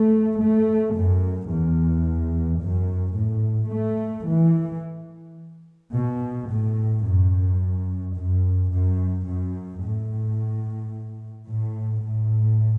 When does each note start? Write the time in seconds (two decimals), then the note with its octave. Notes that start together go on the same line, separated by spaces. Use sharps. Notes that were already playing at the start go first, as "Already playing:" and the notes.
Already playing: A3
0.39 A3
0.95 F#2
1.49 E2
2.61 F#2
3.15 A2
3.71 A3
4.27 E3
5.94 B2
6.48 A2
7.04 F#2
8.15 F#2
8.70 F#2
9.26 F#2
9.81 A2
11.48 A2
12.03 A2